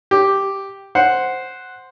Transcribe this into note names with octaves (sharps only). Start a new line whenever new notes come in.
G4
C5 F#5